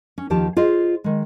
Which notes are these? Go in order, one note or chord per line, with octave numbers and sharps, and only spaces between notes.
C#4
D#2 D#3 F3 G4 A5
F4 G#4 C5 D#5
D#3 G#3